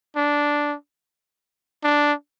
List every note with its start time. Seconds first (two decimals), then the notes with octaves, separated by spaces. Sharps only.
0.16 D4
1.84 D4